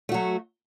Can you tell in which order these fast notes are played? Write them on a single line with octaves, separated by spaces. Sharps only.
A3 F#4 F#3